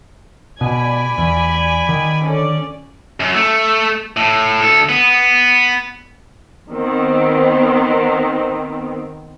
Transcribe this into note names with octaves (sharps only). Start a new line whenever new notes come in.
B2 D5 G#5 B5
E2
D#3
D3 C#4 D5
F#2
A3
A2
D2 A4
B3
D#3 B3 C4